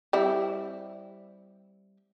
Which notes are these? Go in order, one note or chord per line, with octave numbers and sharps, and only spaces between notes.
G3 C4 E4